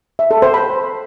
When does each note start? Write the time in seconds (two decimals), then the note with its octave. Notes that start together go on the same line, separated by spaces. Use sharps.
0.19 E5
0.31 A4
0.42 C5
0.54 B5